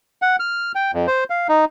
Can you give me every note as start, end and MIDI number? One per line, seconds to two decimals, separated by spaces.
0.22 0.36 78
0.40 0.72 89
0.75 0.91 79
0.94 1.07 41
1.07 1.24 72
1.30 1.47 77
1.49 1.65 63